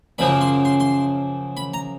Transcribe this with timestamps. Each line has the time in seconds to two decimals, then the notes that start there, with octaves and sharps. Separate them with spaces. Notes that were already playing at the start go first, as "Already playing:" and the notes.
0.18 F#2 C#3 F3 A#3 B5
0.41 C6
0.65 C6
0.80 C6
1.57 B5
1.74 A#5